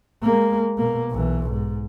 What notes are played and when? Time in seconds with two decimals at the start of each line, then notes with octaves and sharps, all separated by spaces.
0.23 G#3 A#3
0.78 B2 A#3
1.11 B1 E3
1.50 G#2